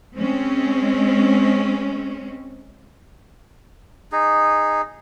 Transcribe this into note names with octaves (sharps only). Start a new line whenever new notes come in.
G#3 C4 C#4
D#4 G#4